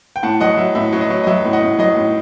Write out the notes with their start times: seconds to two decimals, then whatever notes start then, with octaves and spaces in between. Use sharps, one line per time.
0.16 G5
0.23 A2 F#5 A5
0.41 F#3 D#5 F#5
0.57 F#3 E5
0.75 A2 E5
0.93 F#3
1.01 D#5
1.10 F#3
1.24 D#5
1.27 F#3 E5
1.45 A2
1.53 D#5 F#5
1.62 A2
1.79 F#3 D#5
1.96 A2